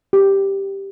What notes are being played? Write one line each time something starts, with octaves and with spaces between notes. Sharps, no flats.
G4